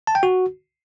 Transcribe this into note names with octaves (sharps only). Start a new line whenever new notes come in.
A5
G5
F#4